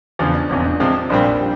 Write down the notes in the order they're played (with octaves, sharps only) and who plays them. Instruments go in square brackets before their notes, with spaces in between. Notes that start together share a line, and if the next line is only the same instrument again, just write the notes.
[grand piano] E2 C#3 F3 [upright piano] D4
[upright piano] D4
[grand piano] E1 E2 C3 [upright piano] C#4
[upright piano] D4
[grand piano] C3 F3 G#3 C4
[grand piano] A#1 A#2 G3 C4 [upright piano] D4
[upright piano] G4